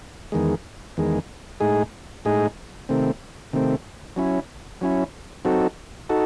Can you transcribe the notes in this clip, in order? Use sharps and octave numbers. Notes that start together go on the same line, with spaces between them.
E2 D#3 G#3
E2 D#3 G#3
A2 G#3 D#4 G#4
A2 G#3 D#4 G#4
C3 D#3 A3 C4
C3 D#3 A3 C4
F#3 C#4 E4
F#3 C#4 E4
F#3 C4 D#4 F#4 A4
D#4 F#4 A4